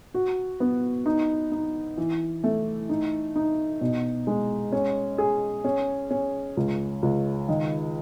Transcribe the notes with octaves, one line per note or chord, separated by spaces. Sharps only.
F#4
B3
D#4
D#4
E3
A3
D#4
D#4
B2
G#3
C#4
G#4
C#4
C#4
C#2
C#2
D#3